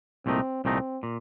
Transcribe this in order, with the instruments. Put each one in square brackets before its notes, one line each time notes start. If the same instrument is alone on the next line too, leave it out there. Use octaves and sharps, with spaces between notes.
[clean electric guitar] C2 A#2 A3 D#4 [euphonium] C4
[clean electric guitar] C2 A#2 A3 D#4 [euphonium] C4
[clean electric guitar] A#2